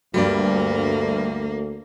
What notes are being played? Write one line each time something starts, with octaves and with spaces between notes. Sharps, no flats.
D2 G2 F#3 G3 A#3 D5